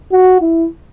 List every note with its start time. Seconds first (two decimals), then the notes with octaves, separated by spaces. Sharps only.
0.12 F#4
0.41 E4